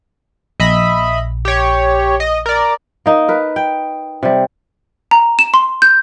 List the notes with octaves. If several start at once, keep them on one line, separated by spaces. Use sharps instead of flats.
A#1 D#5 E5 B5
G4 C#5
D#5
A#4 D5
A#3 D#4
A#4 B4
G5
C3 G3
A#5
E7
C6
G6